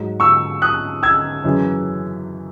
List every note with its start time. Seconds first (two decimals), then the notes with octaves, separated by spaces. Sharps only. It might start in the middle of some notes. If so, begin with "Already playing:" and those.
Already playing: G#2 F#3
0.20 C#6 E6
0.62 D#6 F#6
1.03 E6 G#6
1.44 F#2 C#3 E3